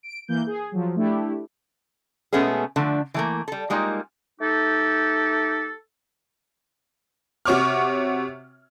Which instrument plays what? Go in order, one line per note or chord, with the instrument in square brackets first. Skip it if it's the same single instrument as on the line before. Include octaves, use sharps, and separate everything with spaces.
[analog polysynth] D7
E3 A#3 G6
G#4
F3 F#3
A3 D4 E4 G4
[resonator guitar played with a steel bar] B2 G#3 A3 B3 C#4 G#4
D3 F3 A3 D4
E3 A3 A#3
G3 A4
G3 G#3 A#3 D#4 F4
[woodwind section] A3 D#4 G4 A4
[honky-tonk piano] C3 F#4 C#5 C#6 D6 F6